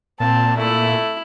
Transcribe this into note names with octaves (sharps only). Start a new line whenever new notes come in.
A#2 C4 A5
A3 E4